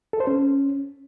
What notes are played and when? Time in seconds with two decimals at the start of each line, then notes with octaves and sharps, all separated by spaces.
0.13 A4
0.20 C5
0.27 C#4